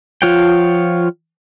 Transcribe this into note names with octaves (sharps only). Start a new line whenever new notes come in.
F3 F4 C#5 F#5 G5